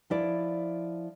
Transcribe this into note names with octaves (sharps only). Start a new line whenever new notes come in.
F3 E4 D5